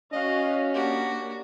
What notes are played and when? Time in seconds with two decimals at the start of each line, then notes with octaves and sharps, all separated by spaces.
0.12 C#4 F#4 D#5 F5
0.75 A#3 D4 F#4 G4